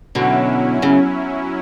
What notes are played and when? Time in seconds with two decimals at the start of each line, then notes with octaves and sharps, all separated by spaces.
0.15 B2 D3 F#3 C#4 E4
0.82 C#3